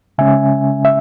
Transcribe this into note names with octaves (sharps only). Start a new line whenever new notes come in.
C#3 G#3 C#4 E5 G#5
E5